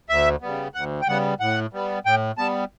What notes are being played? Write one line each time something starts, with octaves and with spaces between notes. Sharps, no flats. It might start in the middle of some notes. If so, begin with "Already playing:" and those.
D2 E5
C#3 G3 B3
D2 F#5
G5
C#3 G3 B3 F#5
A2 F#5
G3 B3
A2 G5
G3 B3 A5